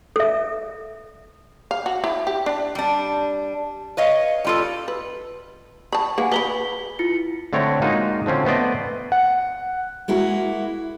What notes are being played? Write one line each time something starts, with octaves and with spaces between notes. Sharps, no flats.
A4 E5
F5
F#4
E4
G4
D4
G3 D4
B4 C#5 D#5 F5
G3 F4 A4
B4
A5 B5 C#6
A#3 E4 G#4 B4 F#5 G#5
B4 A#5 B5 B6 G7
E4 F4 C#7
D3 A3 C4 C#5 D5 A#5
G#3 A#3 D#4 F4 F#4
D3 F3 C4 C#4
A3 B3 C5 D5 D#5
F#5
G#3 A#3 E4 F#4